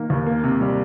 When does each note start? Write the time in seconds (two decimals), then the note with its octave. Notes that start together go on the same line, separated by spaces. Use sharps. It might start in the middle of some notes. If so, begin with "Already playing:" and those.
Already playing: D#3 A#3
0.10 D#2
0.26 A#3
0.44 C3
0.61 G3